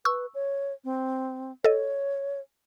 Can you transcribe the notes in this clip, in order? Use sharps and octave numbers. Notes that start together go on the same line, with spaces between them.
B4 C#6 E6
C#5
C4
A4 C#5 D#5